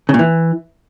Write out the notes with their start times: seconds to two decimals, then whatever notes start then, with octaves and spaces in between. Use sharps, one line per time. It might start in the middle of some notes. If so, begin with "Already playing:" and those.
0.09 C#3
0.14 A#2
0.19 E3